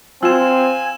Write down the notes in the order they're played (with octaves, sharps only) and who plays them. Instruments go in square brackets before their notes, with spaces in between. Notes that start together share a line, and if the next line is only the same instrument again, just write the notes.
[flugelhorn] C4 [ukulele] F4 [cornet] G#5 [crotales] E6 E7